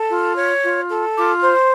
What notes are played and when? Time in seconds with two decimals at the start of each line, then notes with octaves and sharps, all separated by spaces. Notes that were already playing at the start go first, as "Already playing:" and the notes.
Already playing: A4
0.09 F4
0.37 C#5
0.63 F4
0.89 A4
1.15 F4 D6
1.42 C5